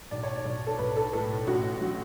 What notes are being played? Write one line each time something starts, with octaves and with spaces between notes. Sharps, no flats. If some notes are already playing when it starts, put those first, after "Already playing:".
B1 D5
C#5
D5
B1
A4
B1 B4
A4
A2 A4
A1 F#4
F#3